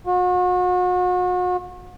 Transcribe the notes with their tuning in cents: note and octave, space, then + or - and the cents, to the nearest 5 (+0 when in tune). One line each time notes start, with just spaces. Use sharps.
F#4 -40